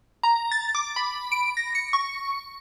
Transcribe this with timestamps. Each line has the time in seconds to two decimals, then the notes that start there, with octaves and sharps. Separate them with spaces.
0.23 A#5
0.51 A6
0.75 D6
0.96 B5
1.32 D7
1.57 A#6
1.75 C#7
1.93 C#6